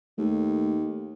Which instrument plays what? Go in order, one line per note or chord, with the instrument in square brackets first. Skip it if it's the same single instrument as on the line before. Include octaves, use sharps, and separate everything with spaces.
[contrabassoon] D#2 [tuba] A3